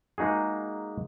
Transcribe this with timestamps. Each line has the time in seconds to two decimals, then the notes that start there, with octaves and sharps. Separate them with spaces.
0.18 G#3 A#3 D#4 F#4 G#4